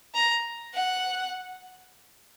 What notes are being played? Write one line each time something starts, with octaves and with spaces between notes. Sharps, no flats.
A#5
F#5